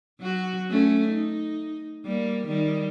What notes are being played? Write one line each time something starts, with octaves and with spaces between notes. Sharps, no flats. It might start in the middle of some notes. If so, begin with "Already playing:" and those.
F#3 F#4
A3 C#4
D#4
G3 A#3
D#3 G3